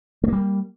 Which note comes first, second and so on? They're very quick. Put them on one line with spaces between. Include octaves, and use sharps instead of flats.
A3 A#3 G3